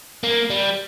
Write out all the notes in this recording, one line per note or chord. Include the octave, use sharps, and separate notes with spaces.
A#3
G3